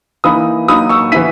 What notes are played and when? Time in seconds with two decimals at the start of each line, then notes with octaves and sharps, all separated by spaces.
0.24 E3 A#3 D#4 B5 D#6
0.68 F#3 A#3 D#4 B5 D#6
0.89 C#6 E6
1.12 E3 B3 E4 B6 D#7